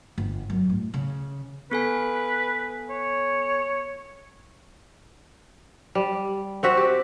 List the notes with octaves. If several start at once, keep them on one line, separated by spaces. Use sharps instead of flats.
G1
F#2
A2
C#3
B3 A4 B4 G#5
C#5
G3
C4 F#4 E5
G4